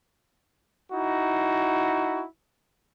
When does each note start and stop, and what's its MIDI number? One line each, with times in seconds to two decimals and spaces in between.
0.93 2.24 63
0.93 2.24 64
0.93 2.24 66